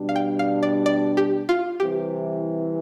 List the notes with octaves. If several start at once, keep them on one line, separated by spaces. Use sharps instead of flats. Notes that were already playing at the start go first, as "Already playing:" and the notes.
Already playing: B2 G3 D4
F5
G5
F5
D5
D5
G4
F4
C2 C3 E3 G4